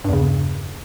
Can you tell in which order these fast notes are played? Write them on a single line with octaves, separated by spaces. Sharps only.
G2 E2 C#3